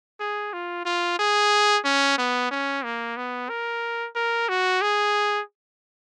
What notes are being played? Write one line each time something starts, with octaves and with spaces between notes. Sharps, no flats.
G#4
F4
F4
G#4
C#4
B3
C#4
A#3
B3
A#4
A#4
F#4
G#4